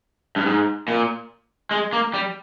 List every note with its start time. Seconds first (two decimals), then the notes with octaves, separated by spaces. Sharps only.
0.36 G2
0.46 G#2
0.88 A#2
1.71 G#3
1.93 A#3
2.14 G3